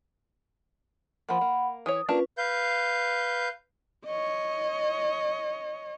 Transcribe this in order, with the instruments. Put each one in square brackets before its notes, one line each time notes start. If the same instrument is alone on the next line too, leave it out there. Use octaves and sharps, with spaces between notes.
[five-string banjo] F3 A#3 [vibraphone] F#5 B5
[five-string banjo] A#3
[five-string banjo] E3 E4 C#5 [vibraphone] D#6
[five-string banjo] A#3 D4 A5 [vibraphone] C#4 F4 B4
[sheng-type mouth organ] B4 F5 G6
[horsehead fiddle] C#5 D#5